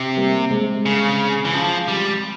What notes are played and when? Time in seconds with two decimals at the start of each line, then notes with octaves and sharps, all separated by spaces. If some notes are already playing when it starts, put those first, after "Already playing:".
Already playing: C3
0.17 G3 A#3
0.51 G#3 C4
0.86 C#3
1.45 E3
1.53 F3
1.88 G3